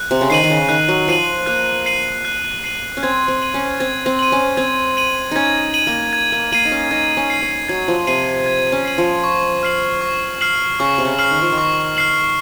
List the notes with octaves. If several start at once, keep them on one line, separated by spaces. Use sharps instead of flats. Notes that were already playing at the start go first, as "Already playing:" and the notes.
Already playing: F#6
C3
C#3
D#3 C7 D#7 F#7
D#3
C#3
D#3 F#6
F#3
F3 C7 D#7 F#7
A#3 F#6
C7 D#7 F#7
F#6
C7 D#7 F#7
C#4
C4 G#6
C4
D#7 F#7
C#4
C4 G#6
C4
D#7 F#7
C#4
C4 G#6
D#7 F#7
C#4 D#4 G#6
D#7 F#7
A#3
G#6
A#3
A#3 C7 D#7 F#7
D#4
C#4
D#4 G#6
C#4
C7 D#7 F#7
C#4
F#3 G#6
F3
C3 C7 D#7 F#7
G#6
C#4
C7 D#7 F#7
F3
C#6
F6 C7 F#7
C#6
F6 C7 F#7
C#3 C#6
C3
C#3
F6 C7 F#7
D#3
F3
D#3
C#6
F6 C7 F#7